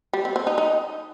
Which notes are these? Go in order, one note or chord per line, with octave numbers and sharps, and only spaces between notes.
G3
C4
C4
D#4
D#4